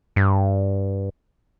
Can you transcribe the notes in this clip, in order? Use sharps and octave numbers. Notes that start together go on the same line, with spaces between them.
G2